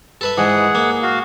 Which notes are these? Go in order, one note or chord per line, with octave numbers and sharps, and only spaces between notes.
A4 B4 E5
G#2 E3 G#4 F#5
A#3
F#4 F5